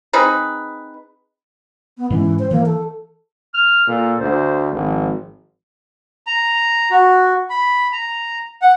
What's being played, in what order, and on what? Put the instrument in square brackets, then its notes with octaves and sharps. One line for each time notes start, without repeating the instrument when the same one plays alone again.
[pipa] C4 D#4 G#4 B4
[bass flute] B3
[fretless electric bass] G#2 G#3 C#4 [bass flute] E3
[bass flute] C5
[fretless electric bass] E3 [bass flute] A#3
[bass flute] A4
[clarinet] F6
[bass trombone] A#2 [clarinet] A4
[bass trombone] D2 [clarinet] C5
[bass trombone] G#1 [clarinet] F3
[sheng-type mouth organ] A#5
F#4
B5
A#5
F#5